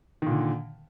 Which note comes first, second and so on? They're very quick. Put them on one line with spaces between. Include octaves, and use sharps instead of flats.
D#3 A#2 D3